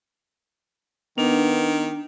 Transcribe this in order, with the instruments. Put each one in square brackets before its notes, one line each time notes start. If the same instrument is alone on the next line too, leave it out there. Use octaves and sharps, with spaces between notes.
[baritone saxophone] D#3 [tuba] B3 [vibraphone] D4